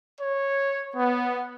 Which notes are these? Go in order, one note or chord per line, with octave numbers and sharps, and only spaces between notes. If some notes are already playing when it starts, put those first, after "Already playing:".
C#5
B3